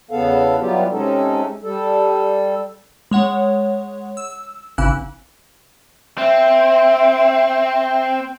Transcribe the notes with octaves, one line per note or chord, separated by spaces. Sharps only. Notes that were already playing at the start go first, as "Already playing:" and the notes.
E2 C#3 B3 A4 F5
E3 F#3 G3 B3 F4 G4
C3 G#3 C#4 D#4 A4
G3 A4
G#3 C#5 F#5
E6
G#1 C#3 E3 E6 F#6
C4 E5